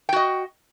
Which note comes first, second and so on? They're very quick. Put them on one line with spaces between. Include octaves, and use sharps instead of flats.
G5 F#4 D#5